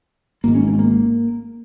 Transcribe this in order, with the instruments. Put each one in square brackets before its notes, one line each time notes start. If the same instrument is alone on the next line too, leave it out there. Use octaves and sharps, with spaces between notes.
[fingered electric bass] G#1 G#2 A#3
C#4
A#3
C#4
A#3